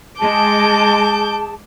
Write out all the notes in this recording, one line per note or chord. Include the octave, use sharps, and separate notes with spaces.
G#3 G#4 A5 D6 G6